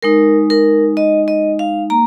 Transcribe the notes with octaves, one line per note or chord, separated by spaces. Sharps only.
G#3 D#4 A#4
A#4
D#5
D#5
F5
A#3 A#5